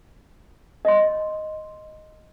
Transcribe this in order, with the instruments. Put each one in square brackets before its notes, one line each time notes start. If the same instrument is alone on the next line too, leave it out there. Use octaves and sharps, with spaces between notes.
[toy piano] D#5 C6